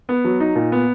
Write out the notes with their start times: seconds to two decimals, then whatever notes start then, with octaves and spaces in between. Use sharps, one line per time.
0.09 B3
0.24 F#3
0.40 D#4
0.55 A#2
0.72 B3